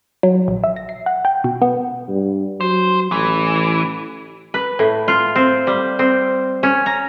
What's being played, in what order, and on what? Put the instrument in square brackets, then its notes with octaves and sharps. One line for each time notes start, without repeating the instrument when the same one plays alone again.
[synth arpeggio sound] F#3
A#1
E5
A#6
C7
F#5
G5
B2
B3
[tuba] G2
[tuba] F#3 [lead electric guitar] C5
[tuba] A1 [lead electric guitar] E3
[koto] B4
A2
F4
C4
G3
C4
C#4
A#5